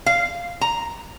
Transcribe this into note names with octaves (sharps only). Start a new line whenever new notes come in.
F5
A#5